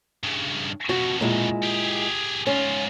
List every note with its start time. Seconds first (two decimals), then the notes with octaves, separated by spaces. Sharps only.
0.23 G2 C#3
0.89 F2 B2 F#4
1.21 A#2 G#3 E4
1.63 G4 G#4
2.47 G#2 C#4 F4